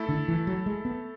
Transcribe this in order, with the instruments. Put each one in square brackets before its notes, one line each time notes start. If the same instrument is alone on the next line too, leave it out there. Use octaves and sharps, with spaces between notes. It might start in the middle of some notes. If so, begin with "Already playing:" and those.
Already playing: [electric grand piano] A3 E4 A4
[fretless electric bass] D3
E3
F#3
G#3
B3